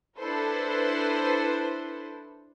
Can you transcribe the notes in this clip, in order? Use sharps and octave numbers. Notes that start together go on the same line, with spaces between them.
D4 E4 A4 B4 C5